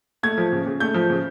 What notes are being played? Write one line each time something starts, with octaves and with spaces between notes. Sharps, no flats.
A3 G#6
F3
C#3
C#3
A3 G6
F3
C#3